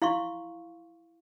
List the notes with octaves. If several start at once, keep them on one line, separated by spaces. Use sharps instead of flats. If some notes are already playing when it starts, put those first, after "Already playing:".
E4 F5 C6 C#6